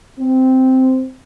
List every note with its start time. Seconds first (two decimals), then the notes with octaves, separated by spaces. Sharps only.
0.19 C4